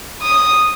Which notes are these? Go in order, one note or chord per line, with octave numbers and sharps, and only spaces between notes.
D#6